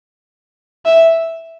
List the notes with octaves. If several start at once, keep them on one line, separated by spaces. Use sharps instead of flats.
E5